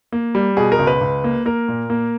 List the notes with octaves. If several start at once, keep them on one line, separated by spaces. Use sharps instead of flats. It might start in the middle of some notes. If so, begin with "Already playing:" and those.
A#3
G3
B2 G#4
A#4
C#2
B4
C#2
A#3
A#3 A#4
A#2
A#3